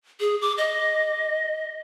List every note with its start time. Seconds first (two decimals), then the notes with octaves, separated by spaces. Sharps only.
0.20 G#4
0.42 D6
0.58 D#5